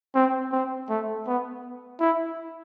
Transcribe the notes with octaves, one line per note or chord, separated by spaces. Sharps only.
C4
C4
A3
B3
E4